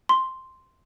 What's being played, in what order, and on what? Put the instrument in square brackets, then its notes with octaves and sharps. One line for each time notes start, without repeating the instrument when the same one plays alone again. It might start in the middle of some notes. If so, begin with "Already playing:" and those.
[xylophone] C6